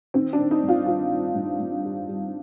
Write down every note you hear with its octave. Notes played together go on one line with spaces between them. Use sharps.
D#3 C4
D4
D#3
D#4
G2
F4
D#3 F4
D#3
G2
G2
G3
G3